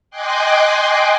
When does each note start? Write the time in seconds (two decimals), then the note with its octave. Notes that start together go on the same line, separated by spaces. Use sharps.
0.11 D#5 G5 G#5 C6 D6 F#6